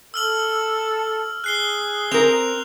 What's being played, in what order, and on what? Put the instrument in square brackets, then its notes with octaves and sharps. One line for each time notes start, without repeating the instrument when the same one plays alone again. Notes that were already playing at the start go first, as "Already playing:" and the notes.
[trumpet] A4 [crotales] E6 F6 F#7
[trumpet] G#4 [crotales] F#6 C7 G7
[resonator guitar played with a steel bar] C4 A#4 [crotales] F7